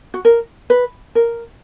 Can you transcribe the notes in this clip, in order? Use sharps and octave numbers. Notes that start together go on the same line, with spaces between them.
F#4
A#4
B4
A#4